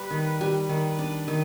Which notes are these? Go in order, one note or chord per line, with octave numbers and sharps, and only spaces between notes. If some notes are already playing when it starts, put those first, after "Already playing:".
Already playing: G3 B4
D#3
G3
D#3
D4
D#3